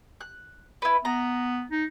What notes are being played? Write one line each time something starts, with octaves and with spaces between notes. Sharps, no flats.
F#6
E4 B4
B3 A#5
D#4